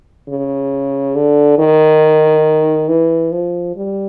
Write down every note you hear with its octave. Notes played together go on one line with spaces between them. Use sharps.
C#3
D3
D#3
E3
F3
G3